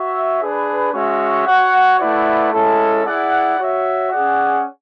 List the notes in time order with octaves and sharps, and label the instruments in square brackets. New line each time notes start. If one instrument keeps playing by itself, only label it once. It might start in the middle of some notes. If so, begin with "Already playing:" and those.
Already playing: [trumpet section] F#4 C#5 E5
D4 G#4 B4
G#3 C#4 F#4 C#5 E5
F#4 C#5 F#5
A3 E4 B4 D5 F#5
G#3 C#4 E4 A4
E4 G#4 D5 F#5
F#4 C#5 E5
C#4 G#4 D5 F#5